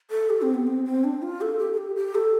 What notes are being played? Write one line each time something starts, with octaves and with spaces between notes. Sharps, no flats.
A4
G4
C4
B3
C4
C4
D4
F4
A4
G4
A4
G4
G4
A4